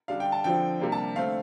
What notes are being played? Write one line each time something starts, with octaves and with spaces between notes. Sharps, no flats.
D3 G3 D4 F5
G5
A5
D3 F3 C4 G5
C3 G3 A#3 D4
A5
D3 A3 C4 F5